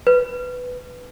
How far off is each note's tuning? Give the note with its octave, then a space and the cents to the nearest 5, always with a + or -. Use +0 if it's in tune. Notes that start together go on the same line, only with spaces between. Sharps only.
B4 +10